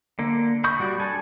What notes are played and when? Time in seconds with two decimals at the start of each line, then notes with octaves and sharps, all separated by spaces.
0.19 D3 A#3
0.64 B5 C#6 D#6 G6
0.79 G3 F#4 D5
1.00 D4 A4 G#5